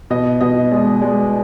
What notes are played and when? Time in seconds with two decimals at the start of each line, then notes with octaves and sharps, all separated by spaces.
0.10 B2 D#5
0.41 B2 D#5
0.71 G#3 D5
1.02 G#3 D5